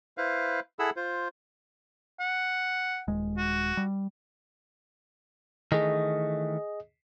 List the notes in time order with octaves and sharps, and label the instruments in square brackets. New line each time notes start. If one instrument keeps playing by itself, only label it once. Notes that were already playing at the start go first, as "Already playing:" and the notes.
[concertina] E4 B4 C5 F5
E4 G#4 A4 F#5 B5 E6
F4 C5
[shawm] F#5
[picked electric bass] D#1 G#3
[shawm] F#4
[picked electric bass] G3
[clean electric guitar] D#3 E3 A3 [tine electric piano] G#4 D#5